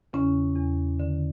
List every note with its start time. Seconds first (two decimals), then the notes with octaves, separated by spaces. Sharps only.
0.13 E2 C#3 C#4
0.56 E2
1.00 D3